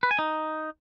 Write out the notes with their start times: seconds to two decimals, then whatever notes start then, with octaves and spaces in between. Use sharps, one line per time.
0.03 B4
0.11 G#5
0.19 D#4